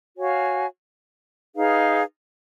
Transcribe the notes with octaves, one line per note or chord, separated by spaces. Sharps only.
F#4 C#5 F5 G#5
D#4 G#4 B4 F5